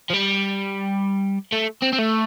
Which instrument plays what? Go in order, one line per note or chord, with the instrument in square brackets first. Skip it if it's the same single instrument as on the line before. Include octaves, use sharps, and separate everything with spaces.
[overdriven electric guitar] F3
G3
A3
C4
C4
A3